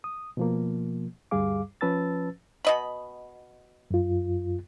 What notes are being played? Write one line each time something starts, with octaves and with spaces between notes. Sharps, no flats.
D#6
B2 F3 A#3
D2 G2 G3 G#4 F5 D6
F3 C#4 B4 A5 E6 A6
B2 D#5 B5
F#2 F4